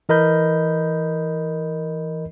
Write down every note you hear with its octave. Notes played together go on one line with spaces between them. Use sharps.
E3 A#4 D#5 B5 G6